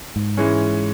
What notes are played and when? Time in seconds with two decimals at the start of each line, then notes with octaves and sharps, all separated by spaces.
0.16 G#2
0.37 E3 G#3 C#4